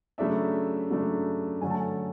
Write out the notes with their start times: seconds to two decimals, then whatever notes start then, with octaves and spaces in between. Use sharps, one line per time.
0.18 C#3 F#3 A3 D4 E5
0.90 C#3 F#3 A3 D4
1.61 F#2 D3 F#3 A3 C#4 G#5
1.70 A5
1.80 G#5